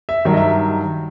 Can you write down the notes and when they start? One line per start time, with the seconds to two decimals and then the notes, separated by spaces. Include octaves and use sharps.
0.09 E5
0.25 G2 D#3 F#3 E5
0.33 D#5
0.37 E5